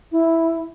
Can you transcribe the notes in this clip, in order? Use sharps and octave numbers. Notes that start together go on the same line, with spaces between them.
E4